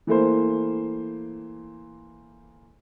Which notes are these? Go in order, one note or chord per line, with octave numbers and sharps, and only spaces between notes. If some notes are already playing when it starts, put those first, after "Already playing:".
E3 A3 A#3 C5